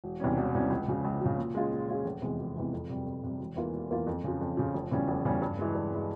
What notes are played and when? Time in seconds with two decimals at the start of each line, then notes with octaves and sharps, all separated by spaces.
0.04 E1
0.20 E2 C3 G3 C#4
0.37 E1
0.54 E2 C3 G3 C#4
0.70 C#2
0.88 C#3 F3
1.05 C#2
1.22 C#3 F3
1.38 A#2
1.55 G#3 C#4 F4 G#4
1.72 A#2
1.89 G#3 C#4 F4 G#4
2.05 F1
2.22 E2 C3 E3 G#3
2.39 F1
2.56 E2 C3 E3 G#3
2.73 F2
2.89 C3 G3
3.06 F2
3.24 C3 G3
3.40 E1
3.56 E2 E3 A#3 F4
3.73 E1
3.90 E2 E3 A#3 F4
4.07 F2
4.24 C#3 F3
4.41 F2
4.57 C#3 F3
4.74 F1
4.91 E2 C#3 G3 C#4
5.08 F1
5.25 E2 C#3 G3 C#4
5.42 G2
5.59 E3 G#3
5.75 G2
5.92 E3 G#3